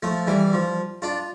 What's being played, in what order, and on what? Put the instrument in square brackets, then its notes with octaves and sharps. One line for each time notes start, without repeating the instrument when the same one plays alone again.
[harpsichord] F3 A3
E3 G3
F3
D4 F4